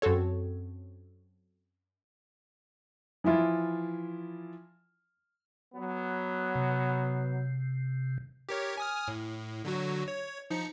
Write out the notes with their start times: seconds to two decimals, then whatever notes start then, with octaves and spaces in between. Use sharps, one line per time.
0.02 F#2 C4 F#4 A4 C#5
3.24 E3 F3 E4 F4
5.74 F#3 B3
6.55 C3
8.49 G4 A#4 C#5
8.78 G#5 D#6 F6
9.08 A2
9.65 D3 F#3 F#4
10.08 C#5
10.50 F3 D#4 C#7